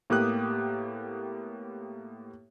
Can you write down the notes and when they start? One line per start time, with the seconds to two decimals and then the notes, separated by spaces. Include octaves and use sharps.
0.10 A2 A#3 B3 G4 D#6 F#6